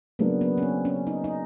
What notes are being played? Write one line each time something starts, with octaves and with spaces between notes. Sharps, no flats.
C#3 F#3 A#3 B3 D4
B3
C#4
C4
C#4
D#4
D#4